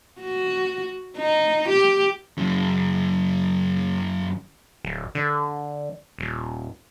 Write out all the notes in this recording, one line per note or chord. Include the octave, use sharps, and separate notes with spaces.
F#4
D#4
G4
F#2 C#3
D1
D3
D#1